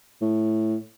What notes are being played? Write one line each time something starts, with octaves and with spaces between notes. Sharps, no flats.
A2